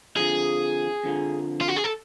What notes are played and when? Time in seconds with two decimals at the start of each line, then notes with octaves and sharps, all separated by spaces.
0.16 F2 D3 F3 G#4
1.04 F2 D3 F3
1.61 F4
1.68 F#4
1.76 G#4
1.84 A4